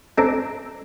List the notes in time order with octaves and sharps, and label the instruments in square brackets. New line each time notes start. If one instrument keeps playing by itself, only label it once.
[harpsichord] C4 D4 A4 G#5 A#5